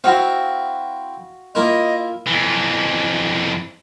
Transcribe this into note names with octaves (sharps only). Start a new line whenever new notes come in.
C4 E4 F#4 F5
A#3 E4 F4 D#5
F2 E3